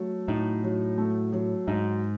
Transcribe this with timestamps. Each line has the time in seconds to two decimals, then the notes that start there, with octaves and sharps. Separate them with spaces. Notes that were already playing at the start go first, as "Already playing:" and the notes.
Already playing: F#3 A3
0.28 A2 D#4
0.64 F#3
0.98 A3
1.33 F#3
1.67 G#2 D#4